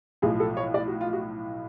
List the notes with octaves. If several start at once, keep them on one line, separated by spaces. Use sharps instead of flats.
B1 A2 F3 G#4
A4
C#5
D5
F#4
F4
F#4